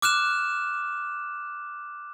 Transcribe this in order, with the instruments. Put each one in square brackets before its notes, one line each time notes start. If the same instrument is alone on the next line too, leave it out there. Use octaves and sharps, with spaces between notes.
[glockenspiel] D6 F6 F#6 E7